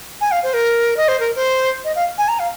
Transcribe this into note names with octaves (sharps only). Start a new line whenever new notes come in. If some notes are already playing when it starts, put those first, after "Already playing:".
G#5
F5
C5
A#4
D#5
C5
A#4
C5
D#5
F5
G#5
A#5
F5